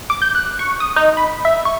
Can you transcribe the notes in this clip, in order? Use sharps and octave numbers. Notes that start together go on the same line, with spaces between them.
D6
G6
F#6
C#6
D#6
D#4
B5
E5
C#6